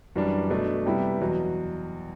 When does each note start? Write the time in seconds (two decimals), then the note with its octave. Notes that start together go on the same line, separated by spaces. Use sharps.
0.16 F#2 E3 G3 D4
0.50 B2 A3 D4
0.86 C3 G3 B3 E4
1.21 E2 B2 F#3